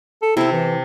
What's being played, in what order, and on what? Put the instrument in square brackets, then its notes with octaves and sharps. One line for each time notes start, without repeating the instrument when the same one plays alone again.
[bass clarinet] A4
[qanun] C3 C4 [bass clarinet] E4
[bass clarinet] E3